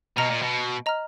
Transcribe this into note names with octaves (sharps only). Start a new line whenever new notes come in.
B2 D#5 A#5 F6
A#2
B2
D#5 A#5 F6